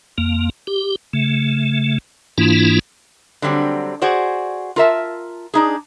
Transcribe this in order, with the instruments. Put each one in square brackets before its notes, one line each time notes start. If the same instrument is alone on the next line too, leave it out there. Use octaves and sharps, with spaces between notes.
[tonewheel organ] F2 A#3
G4
C#3 A3
G#2 E3 A#3 D4 E4 F4
[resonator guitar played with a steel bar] D3 F#3 G3 C4
F#4 G#4 C5 D5
F4 A#4 E5 A5
D4 D#4 G#4